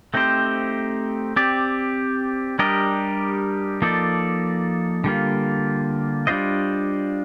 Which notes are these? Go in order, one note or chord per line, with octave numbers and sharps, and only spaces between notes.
A3 C4 D#4 G4 C5
C4 G4 D5
G3 D4 G4 A#4 D#5
F3 A#3 D#4 A4 D5
D3 G3 A#3 F4
G3 D4 F4 C5 D#5